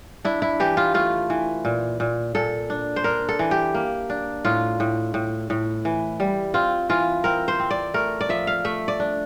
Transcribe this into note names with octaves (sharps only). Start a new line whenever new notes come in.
D4 E4
E4
E3 G4
F4
A3 F4
E3
A#2
A#2
A#2 A4
D4
C5
D4 A#4
A4
E3
G4
A#3
D4
A2 F4
A2
A2
A2
E3
G3
C4 F4
E3 F4
C4 A#4
C5
C4
D5
A3 A#4
D5
F3 E5
F5
A3 E5
D5
D4